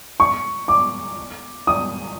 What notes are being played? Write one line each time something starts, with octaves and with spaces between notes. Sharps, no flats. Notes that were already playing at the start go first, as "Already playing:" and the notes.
C#6
D6
D#6